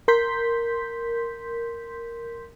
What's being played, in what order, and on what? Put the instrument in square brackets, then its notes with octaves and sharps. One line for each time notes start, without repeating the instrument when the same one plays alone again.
[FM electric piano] A#4 C6 G6 B6